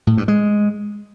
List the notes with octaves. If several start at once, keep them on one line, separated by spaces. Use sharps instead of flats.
A2
G2
G#3